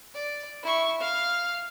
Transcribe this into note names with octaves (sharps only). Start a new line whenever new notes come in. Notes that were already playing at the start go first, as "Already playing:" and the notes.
D5
E4 C#6
F5